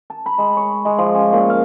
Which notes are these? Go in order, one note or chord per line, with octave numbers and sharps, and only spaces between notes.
A5
B5
G#3
C#5
G#3
F3
C#4
A#2
F5